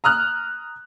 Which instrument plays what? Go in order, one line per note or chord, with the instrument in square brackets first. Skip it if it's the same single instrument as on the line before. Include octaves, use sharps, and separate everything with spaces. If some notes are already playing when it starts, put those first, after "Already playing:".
[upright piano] A#5 D#6 F6 F#6